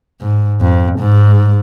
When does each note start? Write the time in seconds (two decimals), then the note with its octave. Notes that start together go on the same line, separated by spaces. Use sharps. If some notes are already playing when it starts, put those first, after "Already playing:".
0.21 G#2
0.61 F2
0.99 G#2